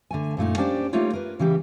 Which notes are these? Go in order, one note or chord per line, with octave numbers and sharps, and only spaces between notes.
D3 A3 G#5
F#2 A#2 A3 D#4
A#3 C#4 D4 G4 C5 D5
G3 A3 A#3 D#4 F4 C#5
A#4 B4
C#3 E3 G3 G4